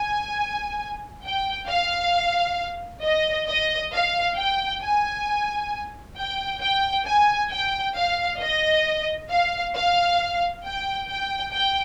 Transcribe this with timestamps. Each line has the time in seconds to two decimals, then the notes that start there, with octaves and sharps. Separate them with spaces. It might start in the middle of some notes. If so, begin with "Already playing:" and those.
Already playing: G#5
1.23 G5
1.68 F5
3.03 D#5
3.48 D#5
3.93 F5
4.38 G5
4.81 G#5
6.17 G5
6.61 G5
7.06 G#5
7.51 G5
7.96 F5
8.41 D#5
9.29 F5
9.75 F5
10.65 G5
11.09 G5
11.53 G5